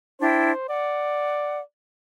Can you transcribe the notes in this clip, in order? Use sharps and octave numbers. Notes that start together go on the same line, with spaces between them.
D4 E4 C5 G5
D5 F#5